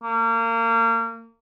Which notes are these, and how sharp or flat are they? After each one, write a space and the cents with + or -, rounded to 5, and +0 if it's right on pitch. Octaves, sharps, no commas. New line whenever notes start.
A#3 -30